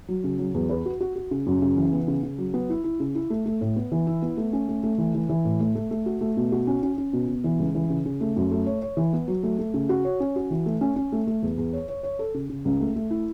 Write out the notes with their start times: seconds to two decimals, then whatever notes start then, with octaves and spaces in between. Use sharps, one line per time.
0.08 F#3
0.24 C#3
0.39 F#3
0.54 E2
0.70 B4
0.85 F#4
1.01 F#4
1.16 F#4
1.31 C#3
1.46 F#2
1.62 C#3
1.76 E3
1.93 B3
2.08 C#3
2.23 C#3
2.38 F#3
2.54 B3
2.70 E4
2.84 E4
3.00 C#3
3.15 E4
3.30 A3
3.46 A3
3.61 A2
3.76 B3
3.92 E3
4.07 E4
4.22 B3
4.37 A3
4.53 C#4
4.68 A3
4.83 A3
4.98 E3
5.14 E3
5.29 E3
5.45 A2
5.60 A3
5.75 A3
5.91 A3
6.06 F#4
6.21 A3
6.37 B2
6.52 F#4
6.67 C#4
6.83 C#4
6.98 C#4
7.13 B2
7.28 B2
7.44 E3
7.59 C#2
7.75 E3
7.90 C#3
8.05 C#3
8.21 A3
8.36 F#2
8.51 A3
8.66 C#5
8.82 C#5
8.97 E3
9.13 B3
9.28 F#3
9.43 A3
9.59 A3
9.74 C#3
9.89 F#4
10.05 C#5
10.20 C#4
10.36 F#4
10.51 E3
10.66 A3
10.81 C#4
10.96 C#4
11.12 A3
11.27 A3
11.42 E2
11.58 E2
11.73 C#5
11.88 C#5
12.03 C#5
12.19 A4
12.34 C#3
12.49 C#3
12.65 C#2
12.80 A3
12.96 A3
13.10 E4